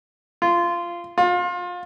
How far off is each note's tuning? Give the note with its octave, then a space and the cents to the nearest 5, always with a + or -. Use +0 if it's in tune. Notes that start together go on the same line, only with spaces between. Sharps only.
F4 -15
F4 +30